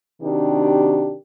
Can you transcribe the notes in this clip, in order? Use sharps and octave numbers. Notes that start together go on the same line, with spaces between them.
C3 D#3 D4 F#4 G4